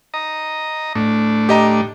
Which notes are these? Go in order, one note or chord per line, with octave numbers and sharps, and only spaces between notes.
D#5 A#5
A2 A3 D4
G4 D#5 A#5